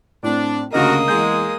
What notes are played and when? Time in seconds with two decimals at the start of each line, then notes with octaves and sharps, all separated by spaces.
0.23 A2 C4 D4
0.73 D2 G2 C#3 A#3 F#4 A#4 D#5 D#6
1.08 E2 G#3 G6